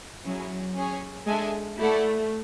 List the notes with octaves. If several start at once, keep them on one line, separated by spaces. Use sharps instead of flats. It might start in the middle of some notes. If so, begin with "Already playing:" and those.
F#3 C#4 E4 G#4
C#4 G#4 C#5
G#3 D4 A4 E5 G#5
A3 E4 A4 D5 F#5 A5